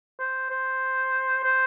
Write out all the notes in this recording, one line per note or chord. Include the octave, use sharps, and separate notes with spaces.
C5
C5
C5